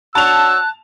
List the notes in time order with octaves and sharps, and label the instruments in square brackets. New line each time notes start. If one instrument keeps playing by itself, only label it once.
[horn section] D4 F#4 C#5 [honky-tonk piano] A5 F7 [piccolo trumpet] E6 [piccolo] F#6